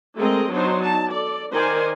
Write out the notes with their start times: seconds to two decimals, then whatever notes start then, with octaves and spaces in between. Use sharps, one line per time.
0.17 G#3 A3 C4 A#4 D#5
0.51 F#3 B3 D4 D#4 C5
0.83 A5
1.12 A4 D5
1.52 D#3 D#4 A#4 C5 D5 G#5